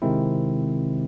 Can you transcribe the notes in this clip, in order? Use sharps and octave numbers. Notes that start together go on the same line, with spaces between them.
C3 D#3 G#3 C4 E4